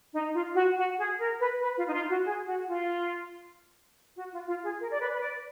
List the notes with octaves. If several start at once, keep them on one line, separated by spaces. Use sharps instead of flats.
D#4
F4
F#4
F#4
G#4
A#4
B4
B4
F4
D#4
F4
F#4
G#4
F#4
F4
F#4
F4
F4
G#4
A#4
D5
B4
B4
D5